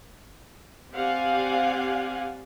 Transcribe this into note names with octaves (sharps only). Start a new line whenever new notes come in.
C4 G4 D5 F5 F#5 G#5